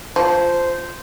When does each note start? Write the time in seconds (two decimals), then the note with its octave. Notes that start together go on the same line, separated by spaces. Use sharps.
0.16 F3 C5